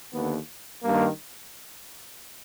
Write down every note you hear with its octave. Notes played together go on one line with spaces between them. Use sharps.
D#2 D3 B3
G2 D#3 A#3